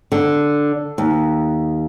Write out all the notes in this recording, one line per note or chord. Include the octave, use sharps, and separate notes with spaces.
D3
D#2